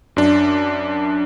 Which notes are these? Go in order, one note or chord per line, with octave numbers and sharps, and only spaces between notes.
F#2 D4